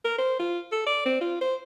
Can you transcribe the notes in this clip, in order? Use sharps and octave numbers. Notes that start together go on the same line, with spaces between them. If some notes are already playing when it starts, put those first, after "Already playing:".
A#4
C5
F4
A4
D5
C4
F4
C5